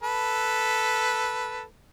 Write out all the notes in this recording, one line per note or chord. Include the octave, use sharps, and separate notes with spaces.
A4 B4